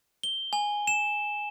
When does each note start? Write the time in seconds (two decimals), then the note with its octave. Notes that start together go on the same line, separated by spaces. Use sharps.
0.23 G7
0.53 G#5
0.87 E7